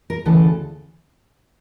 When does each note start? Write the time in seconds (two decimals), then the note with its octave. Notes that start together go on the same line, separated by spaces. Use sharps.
0.10 A#4
0.25 D2 C#3 E3 A4